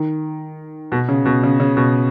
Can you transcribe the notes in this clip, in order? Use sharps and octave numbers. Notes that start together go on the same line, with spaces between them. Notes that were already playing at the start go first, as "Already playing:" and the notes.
Already playing: D#3
B2
C#3
B2
C#3
C#3
B2